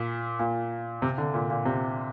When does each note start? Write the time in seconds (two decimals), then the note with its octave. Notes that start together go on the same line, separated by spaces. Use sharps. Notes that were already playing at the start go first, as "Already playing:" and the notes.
Already playing: A#2
0.39 A#2
1.02 C3
1.18 D3
1.34 A#2
1.50 A#2
1.65 C3